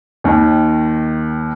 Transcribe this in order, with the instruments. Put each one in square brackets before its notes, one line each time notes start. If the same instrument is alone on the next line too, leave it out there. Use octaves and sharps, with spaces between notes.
[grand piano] D#2 D#3